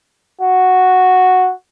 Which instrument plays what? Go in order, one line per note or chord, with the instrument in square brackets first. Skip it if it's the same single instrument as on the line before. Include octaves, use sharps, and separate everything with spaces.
[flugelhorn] F#4